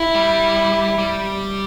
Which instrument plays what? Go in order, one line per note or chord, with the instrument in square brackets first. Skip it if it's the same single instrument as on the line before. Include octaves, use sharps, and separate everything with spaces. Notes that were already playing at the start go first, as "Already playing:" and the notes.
Already playing: [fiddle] E4
[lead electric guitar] G3
G3